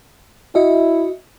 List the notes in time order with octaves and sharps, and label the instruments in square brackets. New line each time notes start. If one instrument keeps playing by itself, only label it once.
[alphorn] E4 [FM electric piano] F#4 D#5 E5